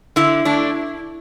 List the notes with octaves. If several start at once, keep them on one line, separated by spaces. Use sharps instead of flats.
D3 E4
A3 D4